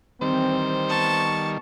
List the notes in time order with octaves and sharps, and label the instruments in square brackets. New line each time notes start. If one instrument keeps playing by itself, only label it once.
[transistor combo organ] D#3 G3 [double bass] E3 C4 [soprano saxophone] C5
[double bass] B3 [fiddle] A5 C#6